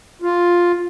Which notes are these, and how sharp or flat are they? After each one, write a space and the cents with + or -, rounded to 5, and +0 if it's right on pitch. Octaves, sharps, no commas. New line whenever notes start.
F4 +5